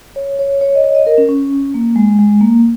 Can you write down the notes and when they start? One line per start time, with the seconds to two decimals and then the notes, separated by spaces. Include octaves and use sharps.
0.16 C#5
0.39 C#5
0.61 C#5
0.75 D#5
0.84 C#5
0.95 D#5
1.06 A#4
1.18 C#4
1.29 C#4
1.74 A#3
1.96 G#3
2.19 G#3
2.41 A#3